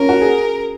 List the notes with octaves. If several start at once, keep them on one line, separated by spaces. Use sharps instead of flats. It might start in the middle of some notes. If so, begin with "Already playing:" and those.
Already playing: C#4 F4 A#4
F#4
G#4